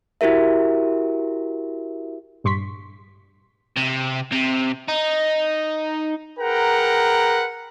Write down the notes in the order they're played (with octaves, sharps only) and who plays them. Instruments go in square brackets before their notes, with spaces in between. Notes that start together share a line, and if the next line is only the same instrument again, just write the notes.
[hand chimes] E4 F#4 G4 A#4 E5
[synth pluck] A#1 G2 C6 C#6 B6
[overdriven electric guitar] C3
C3
D#4
[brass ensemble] G#4 A#4 B4 F#5 G5 A#5